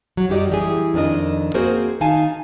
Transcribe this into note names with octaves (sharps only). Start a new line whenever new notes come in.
F#3
F#2 G3 F#4 G4 D5 D#5
E3 G4 G#4
F2 D#3 D4 A#4 D#5
A#3 C4 F#4 G#4 A#4 C5
D#3 D#4 F5 G#5 A5